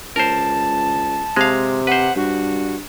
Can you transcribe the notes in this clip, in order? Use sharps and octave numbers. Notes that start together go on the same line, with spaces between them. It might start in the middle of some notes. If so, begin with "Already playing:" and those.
C#2 A#4 C5 A5
C3 G#3 F5
B4 C5 F#5
G2 F#4